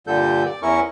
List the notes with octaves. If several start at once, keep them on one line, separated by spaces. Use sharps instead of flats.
G2 A#2 D3 G3 A4 G6
D5
E2 C#4 E4 A#4 C#6